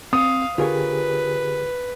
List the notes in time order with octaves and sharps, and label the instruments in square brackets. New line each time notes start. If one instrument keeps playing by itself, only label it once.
[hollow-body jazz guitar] C4 [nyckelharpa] F5 [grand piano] D#6
[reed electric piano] D3 G4 G#4 [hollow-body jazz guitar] F4 A#4 C#5 [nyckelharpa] B4